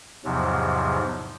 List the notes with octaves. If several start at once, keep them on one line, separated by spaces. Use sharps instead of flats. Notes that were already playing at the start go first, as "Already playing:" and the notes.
E2 G#2 C3 F3 F#3